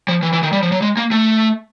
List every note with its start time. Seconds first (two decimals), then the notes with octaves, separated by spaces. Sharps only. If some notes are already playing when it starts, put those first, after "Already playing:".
0.08 F3
0.23 E3
0.33 E3
0.43 D#3
0.53 G3
0.63 F3
0.72 F#3
0.82 G#3
0.97 A#3
1.11 A3